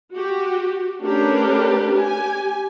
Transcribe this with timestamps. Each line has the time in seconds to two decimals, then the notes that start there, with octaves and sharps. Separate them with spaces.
0.13 F#4 G4
1.02 A3 C#4 D4 G4 A#4 B4
1.93 G4 G#5